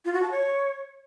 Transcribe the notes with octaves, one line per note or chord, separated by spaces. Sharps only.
F4
F#4
A5
C#5